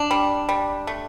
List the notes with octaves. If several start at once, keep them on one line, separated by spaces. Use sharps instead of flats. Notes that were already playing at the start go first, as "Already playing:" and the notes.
Already playing: D4
G3
G3
A3